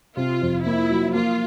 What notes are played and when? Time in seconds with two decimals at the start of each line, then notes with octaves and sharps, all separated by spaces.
0.17 C3 F4
0.42 F2
0.65 A#3 E4
0.90 F#3
1.14 A#3 F4